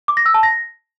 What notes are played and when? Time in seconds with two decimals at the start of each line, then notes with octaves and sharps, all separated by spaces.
0.08 D6
0.17 A#6
0.26 E6
0.34 A5
0.43 A#6